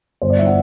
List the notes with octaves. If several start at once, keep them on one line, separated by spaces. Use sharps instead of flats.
G1 C5
D5
E5
E3 F#5